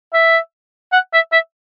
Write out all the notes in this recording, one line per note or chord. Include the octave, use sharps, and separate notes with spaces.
E5
F#5
E5
E5